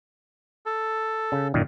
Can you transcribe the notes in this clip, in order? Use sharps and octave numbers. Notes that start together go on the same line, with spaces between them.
A4
C#3
F#2 A#2 D#3